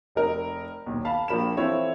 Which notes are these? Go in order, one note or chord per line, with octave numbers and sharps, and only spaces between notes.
F1 D#4 A#4
D#1 B1
F5 A5 B5
A#1 F3 A#4 B5 E7
E3 C4 E4 F4 A4 C#5